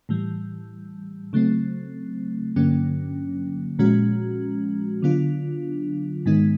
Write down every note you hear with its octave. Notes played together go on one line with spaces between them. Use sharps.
A2 E3 G3
C#3 F#3 A3 C4
G2 D3 F#3 A#3 C#4
A#2 F3 G#3 C#4 F#4
D3 F#3 B3 D4 F4
G#2 D#3 G#3 B3 D#4